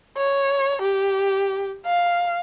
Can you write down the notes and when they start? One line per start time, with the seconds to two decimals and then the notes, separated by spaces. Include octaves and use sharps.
0.17 C#5
0.82 G4
1.86 F5